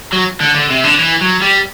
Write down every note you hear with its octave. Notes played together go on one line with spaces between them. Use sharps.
F#3
D3
D3
C3
D3
E3
F#3
G3